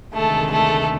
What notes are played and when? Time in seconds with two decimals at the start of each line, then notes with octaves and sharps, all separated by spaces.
0.14 D2 C3 D#3 G#3 A3 A4
0.51 A3 A4